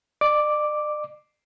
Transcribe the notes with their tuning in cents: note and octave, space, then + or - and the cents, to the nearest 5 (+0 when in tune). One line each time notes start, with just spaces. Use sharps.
D5 +40 D6 +0